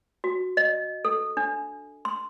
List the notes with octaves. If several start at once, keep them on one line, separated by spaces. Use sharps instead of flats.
F#4
D#5
A4
D4
C6